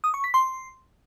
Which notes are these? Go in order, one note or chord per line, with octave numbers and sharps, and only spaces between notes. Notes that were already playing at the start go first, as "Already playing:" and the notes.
D#6
C#6
B6
C6